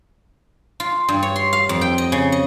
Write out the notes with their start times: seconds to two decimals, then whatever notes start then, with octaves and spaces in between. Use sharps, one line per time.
0.80 F4
1.09 G2
1.23 C#5
1.36 C6
1.53 F5
1.69 F2
1.81 G5
1.98 D#5
2.12 C#3
2.32 D#5